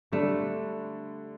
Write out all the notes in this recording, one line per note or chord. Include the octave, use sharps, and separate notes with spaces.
D3 G3 A3 D4